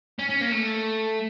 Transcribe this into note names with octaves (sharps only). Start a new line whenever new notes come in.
C#4
C#4
A#3
A3